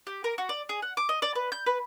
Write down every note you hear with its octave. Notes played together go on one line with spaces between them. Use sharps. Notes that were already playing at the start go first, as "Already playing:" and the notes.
G4
A#4
F#4
D5
G#4
F#5
D6
D#5
D5
B4
G6
B4